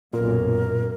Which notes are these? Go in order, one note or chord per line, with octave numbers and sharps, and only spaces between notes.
B1 F#2 A#2 A#4